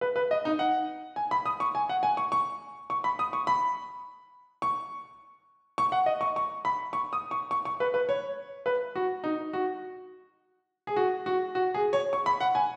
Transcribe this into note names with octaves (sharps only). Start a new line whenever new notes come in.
B4
B4
D#5
D#4
F#5
G#5
B5
D#6
C#6
G#5
F#5
G#5
C#6
C#6
C#6
B5
D#6
C#6
B5
C#6
C#6
F#5
D#5
C#6
C#6
B5
C#6
D#6
C#6
C#6
C#6
B4
B4
C#5
B4
F#4
D#4
F#4
G#4
F#4
F#4
F#4
G#4
C#5
C#6
B5
F#5
G#5